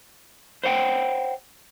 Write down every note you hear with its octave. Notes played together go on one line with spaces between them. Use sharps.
C5 C#5 F#5 G5